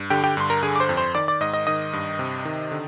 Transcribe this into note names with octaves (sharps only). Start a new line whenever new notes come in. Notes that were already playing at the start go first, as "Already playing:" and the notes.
Already playing: G2
D3 G4 G5
G4 G5
G2 C6
A#4 A#5
D3 G#4 G#5
D6
C5 C6
F2
C5 C6
D#3 D5 D6
D5 D6
G#2 D#5 D#6
D#5 D#6
D#3 D#5 D#6
G2
C3
D#3
D3